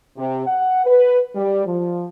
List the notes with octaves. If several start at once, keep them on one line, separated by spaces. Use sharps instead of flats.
C3
F#5
B4
G3
F3